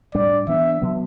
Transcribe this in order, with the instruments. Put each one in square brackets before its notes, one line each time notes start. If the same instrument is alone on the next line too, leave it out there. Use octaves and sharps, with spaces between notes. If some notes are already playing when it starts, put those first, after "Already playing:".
[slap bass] A2 G3 D4 [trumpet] D5
[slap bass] E3 B3 D4 [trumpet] E5
[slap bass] B2 F#3 B3